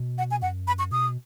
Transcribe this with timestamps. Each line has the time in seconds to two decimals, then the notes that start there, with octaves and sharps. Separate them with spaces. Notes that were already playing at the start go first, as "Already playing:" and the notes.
Already playing: B2
0.18 F#5
0.31 G#5
0.42 F#2 F#5
0.67 B5
0.79 C#6
0.92 B2 D#6